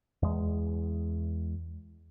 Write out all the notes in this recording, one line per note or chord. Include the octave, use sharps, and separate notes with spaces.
E2 G#3